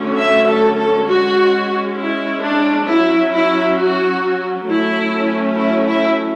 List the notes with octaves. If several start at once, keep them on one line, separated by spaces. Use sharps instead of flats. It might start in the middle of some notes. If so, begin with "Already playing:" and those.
Already playing: D3 F#3 A3 C#4
E5
A4
A4
G#3 C#4 F#4
E4
D4
F#3 C#4 E4
E4
F#4
F#3 A3 C#4 E4
E4
E4